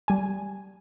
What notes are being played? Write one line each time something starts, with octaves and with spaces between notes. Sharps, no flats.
G3 G#5